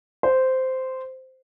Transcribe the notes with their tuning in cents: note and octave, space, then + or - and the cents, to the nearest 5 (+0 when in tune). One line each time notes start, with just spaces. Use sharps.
C5 -10